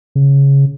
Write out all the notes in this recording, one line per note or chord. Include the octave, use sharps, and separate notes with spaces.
C#3